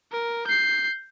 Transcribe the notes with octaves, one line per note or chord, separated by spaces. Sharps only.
A#4
G6 C7